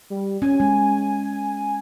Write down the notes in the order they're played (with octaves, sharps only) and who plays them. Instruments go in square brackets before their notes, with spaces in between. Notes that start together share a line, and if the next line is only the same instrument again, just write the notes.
[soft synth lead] G3
[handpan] C#4 [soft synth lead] G#5
[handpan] G#3